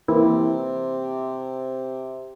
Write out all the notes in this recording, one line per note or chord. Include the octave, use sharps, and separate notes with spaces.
C3 E3 A#3 E4